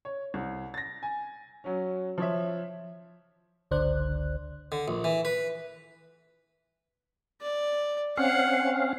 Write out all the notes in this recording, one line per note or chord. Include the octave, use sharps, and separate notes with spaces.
C#5
C2
A6 A#6
G#5
F#3 C#4
F3 C#5 E5
G1 C#2 D3 C5 D5 F#6
D3
A#1
E3
B4
D5
C4 C#4 F5 F#5